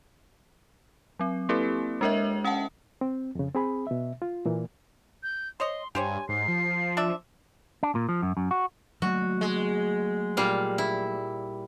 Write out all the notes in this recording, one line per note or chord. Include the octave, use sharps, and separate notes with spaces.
F#3 C4
A#3 C4 E4 G4 A4 B4
G#3 D4 A#4 C#5 D#5 E5
C#4 F#5 G5 A5
C4
F2 C#3
C4 G#4 B5
B2 E5
F4
A#2 E3 A#3
G6
C5 C#5 D#5 C6
G2 G4 C5 C#5 G#5
G#2 C7
F3
D4 D5 E5
D4
A#2
F3
F#2
F#2
F#4
F#3 A3 A#3 F#4
G#3
A#2 G3 F5
E4